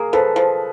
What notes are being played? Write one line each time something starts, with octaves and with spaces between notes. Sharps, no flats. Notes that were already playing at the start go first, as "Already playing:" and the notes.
Already playing: A#3 G#4 A#4
F3 A4 B4
F3